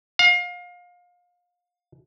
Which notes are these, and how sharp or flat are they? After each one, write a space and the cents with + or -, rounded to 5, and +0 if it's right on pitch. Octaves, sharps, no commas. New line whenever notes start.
F5 +30